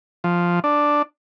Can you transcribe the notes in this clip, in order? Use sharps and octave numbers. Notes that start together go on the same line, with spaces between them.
F3
D4